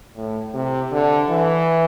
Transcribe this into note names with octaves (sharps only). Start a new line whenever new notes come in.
A2
C3
D3
E3